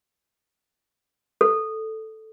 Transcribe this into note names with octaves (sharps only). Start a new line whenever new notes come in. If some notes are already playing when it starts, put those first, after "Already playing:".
A4